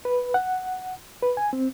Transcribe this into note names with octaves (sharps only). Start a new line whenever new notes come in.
B4
F#5
B4
G#5
C4